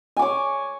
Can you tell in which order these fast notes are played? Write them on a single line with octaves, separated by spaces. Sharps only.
G#5 D6 C#5